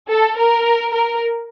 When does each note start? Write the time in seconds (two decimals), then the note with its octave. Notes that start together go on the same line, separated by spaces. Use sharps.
0.09 A4
0.38 A#4
0.93 A#4